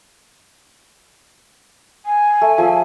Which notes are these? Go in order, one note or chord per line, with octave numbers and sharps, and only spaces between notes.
G#5
A3
F3 G#4 E5